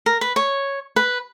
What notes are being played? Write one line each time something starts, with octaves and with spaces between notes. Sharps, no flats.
A#4
B4
C#5
B4